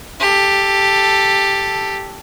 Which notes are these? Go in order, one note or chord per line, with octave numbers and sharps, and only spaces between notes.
G4 A4